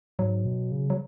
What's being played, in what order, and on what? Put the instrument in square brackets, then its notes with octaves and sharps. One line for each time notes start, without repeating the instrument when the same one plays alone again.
[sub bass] G#2 [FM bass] F#3
[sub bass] B2
C#3
[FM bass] F#3